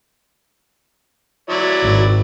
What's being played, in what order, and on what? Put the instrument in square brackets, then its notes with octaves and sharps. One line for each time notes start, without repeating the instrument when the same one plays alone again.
[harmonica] F#3 E4 D5
[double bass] G#1